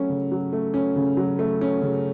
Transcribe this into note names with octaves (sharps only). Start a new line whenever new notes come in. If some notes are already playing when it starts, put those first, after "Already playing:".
Already playing: F#3 A3 C#4
C#3
F#3
A3
C#4
C#3
F#3
A3
C#4
C#3